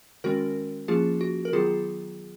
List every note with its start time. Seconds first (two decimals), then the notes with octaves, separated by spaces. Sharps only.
0.24 D#3 G#3 C#4 F#4 A#4
0.88 F3 A#3 C#4 F4 G#4
1.21 F#4
1.45 A#4
1.53 D#3 F#3 B3 F4 G#4